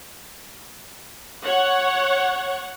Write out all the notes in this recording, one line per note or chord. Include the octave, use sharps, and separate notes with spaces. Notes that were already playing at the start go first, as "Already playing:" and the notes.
C#5 F#5